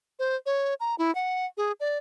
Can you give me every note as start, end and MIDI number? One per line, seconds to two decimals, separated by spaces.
0.19 0.36 72
0.46 0.74 73
0.80 0.95 82
0.98 1.14 64
1.15 1.46 78
1.57 1.72 68
1.80 1.98 74